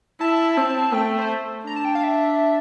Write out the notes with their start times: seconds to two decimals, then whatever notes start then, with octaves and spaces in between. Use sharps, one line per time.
0.21 E4 A5
0.57 C4
0.93 A3 G5
1.19 C5
1.67 D4 A#5
1.76 A5
1.85 G5
1.95 F5
2.03 E5